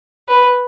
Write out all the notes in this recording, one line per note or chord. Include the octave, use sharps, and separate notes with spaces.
B4